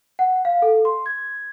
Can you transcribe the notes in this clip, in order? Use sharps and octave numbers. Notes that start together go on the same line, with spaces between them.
F#5
F5
A4
C6
G#6